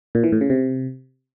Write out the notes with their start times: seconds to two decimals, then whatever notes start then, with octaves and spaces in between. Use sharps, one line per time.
0.15 A#2
0.24 E3
0.32 A2
0.41 C#3
0.50 C3